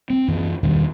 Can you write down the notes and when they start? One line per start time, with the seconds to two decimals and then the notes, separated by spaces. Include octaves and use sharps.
0.10 C4
0.28 F#2 E3
0.63 E2 G2 B2 D#3